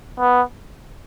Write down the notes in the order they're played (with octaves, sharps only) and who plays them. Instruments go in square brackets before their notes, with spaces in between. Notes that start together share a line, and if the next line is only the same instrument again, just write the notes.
[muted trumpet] B3